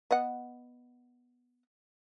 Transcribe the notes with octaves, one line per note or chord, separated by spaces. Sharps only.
B3 D#5 F#5